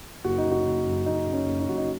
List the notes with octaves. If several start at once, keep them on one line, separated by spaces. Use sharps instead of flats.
F#1 F#4
D#4
C#3
F#4
F#1
F#2
F#1 D#4
C#3
C#4
F#1
D#4
F#2 F#4
D#4